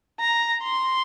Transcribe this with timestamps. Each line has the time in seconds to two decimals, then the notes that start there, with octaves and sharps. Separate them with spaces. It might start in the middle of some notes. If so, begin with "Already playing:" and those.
0.20 A#5
0.63 C6